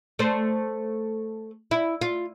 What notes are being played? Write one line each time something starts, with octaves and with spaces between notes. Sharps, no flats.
A3 C5
E4
F4